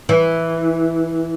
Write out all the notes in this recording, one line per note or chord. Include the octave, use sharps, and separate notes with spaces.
E3